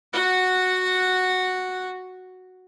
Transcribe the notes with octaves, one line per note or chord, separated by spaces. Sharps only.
F#4 F#5